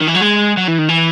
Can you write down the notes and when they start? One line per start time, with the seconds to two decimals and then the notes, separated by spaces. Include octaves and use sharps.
0.02 D#3
0.08 E3
0.16 F#3
0.22 G#3
0.57 F#3
0.68 E3
0.78 D#3
0.88 E3